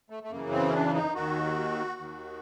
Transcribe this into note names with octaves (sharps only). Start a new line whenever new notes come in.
A3
A3
F#2 C#3 E3 A#3
C4
C#4
D4
D#4
D#2 D#3 F#4
D#2 D#3